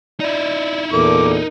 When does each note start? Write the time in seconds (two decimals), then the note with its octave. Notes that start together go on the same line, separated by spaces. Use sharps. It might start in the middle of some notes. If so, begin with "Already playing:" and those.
0.20 D#4 E4 D5
0.92 E2 A#2 A4 A#4 D6